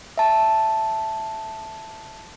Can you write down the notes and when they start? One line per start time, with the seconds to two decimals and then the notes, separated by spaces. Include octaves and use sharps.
0.18 E5 A5